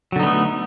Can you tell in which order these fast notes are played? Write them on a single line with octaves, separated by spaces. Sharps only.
F#3 D3 D#4 B3 A3